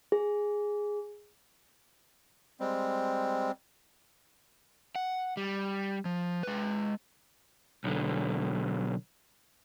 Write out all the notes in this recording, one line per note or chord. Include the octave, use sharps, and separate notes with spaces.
G#4
G3 G#3 C4
F#5
G3
F3
G#3 B4
B1 D3